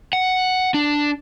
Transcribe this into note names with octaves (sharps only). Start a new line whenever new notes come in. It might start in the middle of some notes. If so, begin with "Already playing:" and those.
F#5
D4